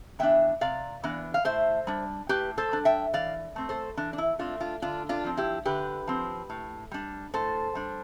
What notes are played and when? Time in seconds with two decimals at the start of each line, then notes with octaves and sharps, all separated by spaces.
0.19 E3 B3 D4 E5 G5
0.61 C3 D5 F5
1.03 E3 B3 D4
1.34 F5
1.45 A2 C5 E5
1.87 G3 D4
2.29 A2 G4 B4
2.58 A4 C5
2.71 G3 D4
2.85 E5 G5
3.13 E3 D5 F5
3.56 A3 C4
3.69 A4 C5
3.97 E3 D4
4.13 D4
4.18 E4
4.39 A3 C4 D4 F4
4.60 D4 F4
4.82 D3 D4 F4
5.09 D4 F4
5.24 F3 C4
5.37 E4 G4
5.65 D3 G4 B4
6.07 F3 C4
6.50 A2
6.91 G3 D4
7.34 A2 A4 C5
7.75 G3 D4